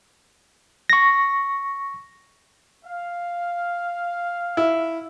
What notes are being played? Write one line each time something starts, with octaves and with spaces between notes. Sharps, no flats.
C#6 A#6
F5
E4